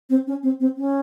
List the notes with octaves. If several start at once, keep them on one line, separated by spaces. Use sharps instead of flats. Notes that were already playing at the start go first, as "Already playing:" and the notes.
C4
C#4
C4
C4
C#4